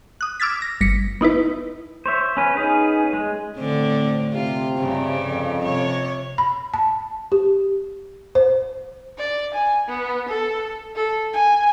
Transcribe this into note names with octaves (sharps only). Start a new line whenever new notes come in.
D#6 F#6
D6 E6 F6 G#6 A6 B6
A#6
G1 A#6 B6 C#7
B3 D#4 E4 B4
C5 C#5 E5
C#4 B4
B3 C#4 D#4 G#4 B4
G#3
A2 D3 C4
C3 F4
G2 C#3
F2
C3 C#5
B5
A5
G4
C5
D5
G#5
B3
A4
A4
G#5